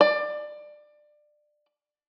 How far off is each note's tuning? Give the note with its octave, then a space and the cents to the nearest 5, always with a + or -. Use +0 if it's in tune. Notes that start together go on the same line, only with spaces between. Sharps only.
D5 +20